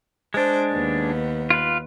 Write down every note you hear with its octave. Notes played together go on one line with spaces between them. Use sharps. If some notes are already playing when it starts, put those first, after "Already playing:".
G#3 D4 C5
D#2 B3
F4 B4